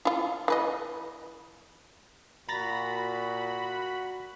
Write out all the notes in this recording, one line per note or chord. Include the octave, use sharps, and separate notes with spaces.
E4 F4
E3 B4 D#5
A#2 F#4 A#5 B5 A6 A#6